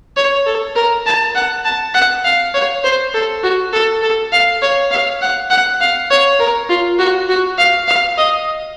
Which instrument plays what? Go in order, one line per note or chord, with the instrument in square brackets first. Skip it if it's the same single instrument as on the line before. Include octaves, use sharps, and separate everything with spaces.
[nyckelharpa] C#5
A4
A#4
A5
F#5
A5
F#5
F5
C#5
C5
A4
F#4
A4
A4
F5
C#5
F5
F#5
F#5
F5
C#5
A#4
F4
F#4
F#4
F5
F5
D#5